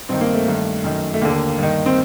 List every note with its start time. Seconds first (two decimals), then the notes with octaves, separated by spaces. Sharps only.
0.09 G2 D#3 C4
0.21 A#3
0.34 A3
0.46 G2 D#3
0.84 F#2 D#3
1.14 A3
1.21 D#2 D3 A#3
1.58 G2 D#3
1.86 C4